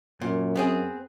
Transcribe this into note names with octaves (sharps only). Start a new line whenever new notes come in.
F#2 A#2
B3 C4 G#4